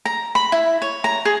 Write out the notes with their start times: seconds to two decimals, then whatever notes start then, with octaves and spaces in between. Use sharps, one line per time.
0.05 A#5
0.35 B5
0.52 E4
0.82 C#5
1.04 A#5
1.25 G#4